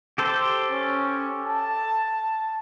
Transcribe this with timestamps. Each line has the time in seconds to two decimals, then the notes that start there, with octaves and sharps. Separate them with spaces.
0.18 G4 A4 C5
0.70 C#4
1.46 A5